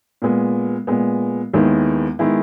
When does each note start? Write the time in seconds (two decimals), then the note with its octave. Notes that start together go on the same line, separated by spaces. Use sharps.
0.22 A#2 G#3 B3
0.87 A#2 G#3 B3
1.53 D#2 D#3 G#3 B3 E4
2.19 D#3 G#3 B3 E4